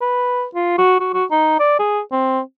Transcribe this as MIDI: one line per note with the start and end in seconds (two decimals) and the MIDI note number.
0.01 0.45 71
0.55 0.75 65
0.78 0.97 66
1.00 1.09 66
1.13 1.24 66
1.31 1.58 63
1.59 1.79 74
1.79 2.00 68
2.12 2.40 60